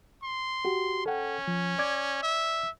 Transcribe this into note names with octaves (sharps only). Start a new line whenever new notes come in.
C6
F#4 G4
C#4 A4 F#5 G5
F3
D5 D6 G#6
E5